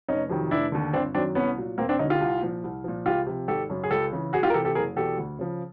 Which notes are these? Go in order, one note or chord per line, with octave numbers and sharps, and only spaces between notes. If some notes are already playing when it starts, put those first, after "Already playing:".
F1 C#4 D#4
F2 C3 D#3 F#3
F1 D4 E4
D#2 D3
G1 C4 D4
F#2 D#3 F#3 C4 D4
C2 B3 C#4
A#2 F#3
E1 A#3 C4
C4 D4
D2 D3 C#4 D#4
F4 G4
C2
A#2 F3
C2
A#2 F3
C#2 F4 G4
C3 F3
G#1 G4 A4
F#2 C#3
G#4
C#2 G4 A4
C#3 E3
C2 F#4 G#4
F4 G4
A#4
C3 E3 G4 A4
G4 A4
F#1 G#4 A#4
E2 B2 G4 A4
D2
C#3 F3